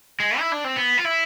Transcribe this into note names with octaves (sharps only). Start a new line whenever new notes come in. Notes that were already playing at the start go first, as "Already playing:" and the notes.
G#3
E4
D4
C4
B3
F4
E4